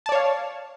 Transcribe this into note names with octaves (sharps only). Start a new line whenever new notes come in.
C#5 D5 F5 A5